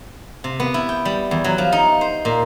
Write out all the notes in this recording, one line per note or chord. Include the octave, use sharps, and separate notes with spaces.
C3
B3
E4
G5
G3
E2
F#3
F3
D#4
C5
A#2